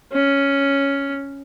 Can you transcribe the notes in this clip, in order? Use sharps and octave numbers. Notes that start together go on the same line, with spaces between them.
C#4